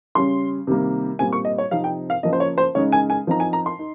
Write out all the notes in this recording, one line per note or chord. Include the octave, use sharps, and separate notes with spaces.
C#3 G3 C#4 C6
C3 D#3 G3 A#3
A#2 G3 C4 G#5
C#6
D#5
C#5
C3 F3 C4 D#4 F5
G5
F5
C#3 F3 A#3 D#5
C5
C#5
C5
C#3 G#3 D#4 C#5
G#5
G#5
F3 C4 D#4 A#5
G#5
A#5
C6
D#4